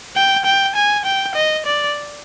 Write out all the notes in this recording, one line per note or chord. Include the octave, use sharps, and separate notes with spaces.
G5
G5
G#5
G5
D#5
D5